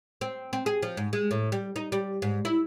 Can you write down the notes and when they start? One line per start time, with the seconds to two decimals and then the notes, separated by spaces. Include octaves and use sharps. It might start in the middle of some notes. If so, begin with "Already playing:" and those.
0.21 C4
0.53 C4
0.66 G#4
0.82 F3
0.97 G#2
1.13 G#3
1.31 A2
1.52 G3
1.76 D#4
1.92 G3
2.22 G#2
2.45 E4